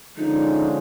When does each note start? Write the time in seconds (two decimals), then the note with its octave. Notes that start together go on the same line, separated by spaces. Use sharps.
0.17 D3 F3 G#3 C#4 D#4